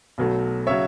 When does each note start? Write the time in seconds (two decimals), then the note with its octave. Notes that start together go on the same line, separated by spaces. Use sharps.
0.18 B1 B2 F#3 A3
0.67 C#3 F#3 C#5 E5